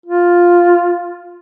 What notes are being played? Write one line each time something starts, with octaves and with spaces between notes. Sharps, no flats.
F4